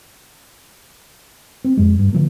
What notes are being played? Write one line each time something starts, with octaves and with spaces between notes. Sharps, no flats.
C4
F2 G#3
G2
D3 F3 A#3